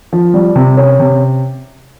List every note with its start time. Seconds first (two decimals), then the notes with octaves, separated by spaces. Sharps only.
0.13 F3
0.34 G3
0.55 C3
0.77 C#4
1.00 C3